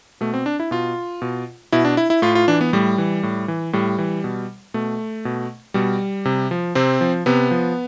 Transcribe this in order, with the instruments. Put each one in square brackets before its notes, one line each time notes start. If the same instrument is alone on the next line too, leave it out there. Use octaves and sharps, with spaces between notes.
[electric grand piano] B2 A3
C4
D4
E4
B2 F4
B2
B2 E4
D4
E4
E4
A2 F4
F4
E3 D4
B3
A2 G3
E3
A2
E3
A2 G3
E3
B2
B2 A3
B2
B2 G3
C3
F3
C3 C4
F3
C3 B3
F3